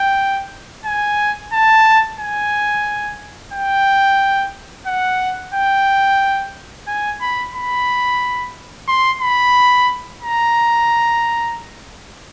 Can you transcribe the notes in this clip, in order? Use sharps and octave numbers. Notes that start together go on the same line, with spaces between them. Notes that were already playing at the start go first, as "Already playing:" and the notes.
Already playing: G5
G#5
A5
G#5
G5
F#5
G5
G#5
B5
B5
C6
B5
A#5